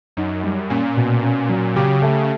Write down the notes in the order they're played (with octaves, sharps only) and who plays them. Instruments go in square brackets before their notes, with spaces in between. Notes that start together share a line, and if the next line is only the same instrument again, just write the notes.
[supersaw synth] F#2 [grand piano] D#4
[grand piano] G3
[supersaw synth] A#2 [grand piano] C#4
[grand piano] B2
C#4
F#3
[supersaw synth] C#3 [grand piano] G4
[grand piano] A3